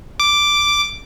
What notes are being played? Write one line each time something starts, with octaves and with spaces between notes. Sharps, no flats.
D6